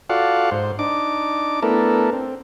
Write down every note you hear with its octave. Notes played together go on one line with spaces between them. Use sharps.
F4 F#4 A4 D5 F5 F#5
G#2 C5
D4 D#4 D6
A3 B3 D4 E4 A4 A#4
C4